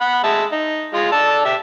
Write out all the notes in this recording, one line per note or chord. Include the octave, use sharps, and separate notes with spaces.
F#5 B5
G#3 E5 A5
D#4
G#3 F4
D4 A5 E6
G4 E5